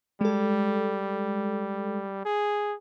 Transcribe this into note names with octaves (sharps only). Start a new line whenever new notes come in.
G3 G#3 A4
G#4